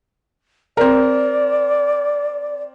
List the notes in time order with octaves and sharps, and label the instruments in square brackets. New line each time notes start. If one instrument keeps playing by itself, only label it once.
[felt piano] C4 A#4 [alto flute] D5